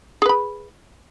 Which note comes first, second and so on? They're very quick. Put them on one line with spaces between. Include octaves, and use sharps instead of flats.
G#4 B4 B5